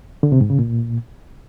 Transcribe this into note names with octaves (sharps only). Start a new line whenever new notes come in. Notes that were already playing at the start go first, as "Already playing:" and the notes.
D3
C3
G#2
C#3
A#2